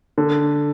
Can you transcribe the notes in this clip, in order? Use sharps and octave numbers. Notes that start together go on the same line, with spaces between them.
D3